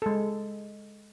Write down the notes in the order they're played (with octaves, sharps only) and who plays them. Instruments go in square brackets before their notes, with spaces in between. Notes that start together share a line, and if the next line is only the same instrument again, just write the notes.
[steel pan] G#3 A4